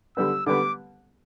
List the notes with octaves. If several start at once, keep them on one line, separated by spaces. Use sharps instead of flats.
D3 G3 B3 E6
D3 G3 B3 D6